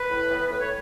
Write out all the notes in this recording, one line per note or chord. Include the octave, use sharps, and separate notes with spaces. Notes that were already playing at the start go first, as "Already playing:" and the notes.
Already playing: B4
A2
E3 B3
A2 B4
C#5